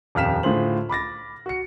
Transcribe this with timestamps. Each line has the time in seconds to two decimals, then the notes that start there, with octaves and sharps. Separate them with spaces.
0.15 D#1 F2 F5 F6 B6 E7
0.43 A2 D3 F4 G#4 C5 F#7
0.89 B5 D6 A6 A#6
1.46 F#4 C#7